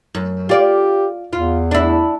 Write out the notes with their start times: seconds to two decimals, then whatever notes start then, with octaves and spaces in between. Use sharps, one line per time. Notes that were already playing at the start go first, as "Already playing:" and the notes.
0.15 F#2
0.49 F4 G4 D5
1.33 E2 F4
1.71 D4 E4